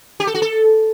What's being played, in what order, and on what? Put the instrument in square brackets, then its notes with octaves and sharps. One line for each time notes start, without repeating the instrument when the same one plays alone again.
[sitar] G4
A4
F#4
A4